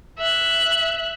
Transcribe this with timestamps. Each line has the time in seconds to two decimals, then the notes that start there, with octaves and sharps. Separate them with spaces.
0.18 E5 F#6